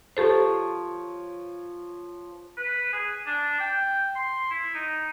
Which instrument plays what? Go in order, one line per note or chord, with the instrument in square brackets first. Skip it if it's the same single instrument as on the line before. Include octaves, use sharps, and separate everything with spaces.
[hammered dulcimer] F3 C#5 C#6 [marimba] G4 A4 C5
[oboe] B4
G#4
D4
G5
C6
E4
D#4